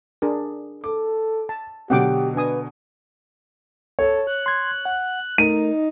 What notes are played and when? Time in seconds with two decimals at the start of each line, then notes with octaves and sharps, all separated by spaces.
0.22 D4 G#4 A#4
0.84 A4 D6
1.49 A5
1.90 B2 D3 F#3 G4 F#5 G5 D6
2.36 D4 B4 G#5 D#6
3.99 A4 C#5
4.27 F#6
4.46 C6 G#6
4.85 F#5
5.38 A3 D#4 A#4 D#7